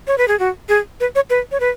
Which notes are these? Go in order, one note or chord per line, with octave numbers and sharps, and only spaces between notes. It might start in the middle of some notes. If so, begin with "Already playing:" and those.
C#5
B4
G#4
F#4
G#4
B4
C#5
B4
C#5
B4